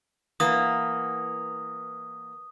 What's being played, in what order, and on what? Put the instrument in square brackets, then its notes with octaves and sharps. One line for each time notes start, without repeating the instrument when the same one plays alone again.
[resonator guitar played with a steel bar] E3 A#3 B3 [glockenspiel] D#6